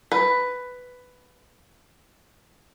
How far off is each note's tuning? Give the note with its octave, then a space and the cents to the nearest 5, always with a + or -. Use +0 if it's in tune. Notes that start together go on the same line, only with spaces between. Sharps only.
B4 +10